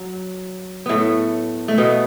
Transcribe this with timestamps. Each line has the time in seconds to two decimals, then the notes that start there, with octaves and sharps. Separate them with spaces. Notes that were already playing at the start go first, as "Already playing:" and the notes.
Already playing: F#3
0.86 A2 A3 B3
1.68 A3
1.78 B2 B3